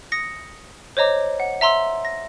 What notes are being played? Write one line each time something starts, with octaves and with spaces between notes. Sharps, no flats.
D#6 A#6 C#7
C5 C#5 D#5 A#5 D6
F#5
E5 A#5 C6 E6
A#6